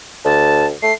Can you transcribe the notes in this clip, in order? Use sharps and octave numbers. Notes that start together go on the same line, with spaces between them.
D2 A5
A3 C7